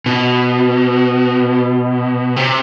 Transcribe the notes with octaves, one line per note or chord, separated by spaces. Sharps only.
B2
C3